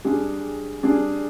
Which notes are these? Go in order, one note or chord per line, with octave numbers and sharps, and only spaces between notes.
G3 D4 G#4
G3 D4 G#4